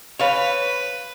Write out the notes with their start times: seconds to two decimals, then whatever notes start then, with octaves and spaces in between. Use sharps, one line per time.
0.20 B4 C#5 F5